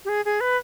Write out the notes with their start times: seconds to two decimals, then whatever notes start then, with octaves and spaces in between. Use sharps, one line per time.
0.05 G4
0.09 G#4
0.25 G#4
0.41 B4